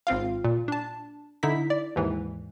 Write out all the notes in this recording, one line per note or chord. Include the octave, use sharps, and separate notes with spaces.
G#1 C4 F4 F5
A#2
D4 A5
D3 D#4 E4 B6
D5
D#2 G#2 E3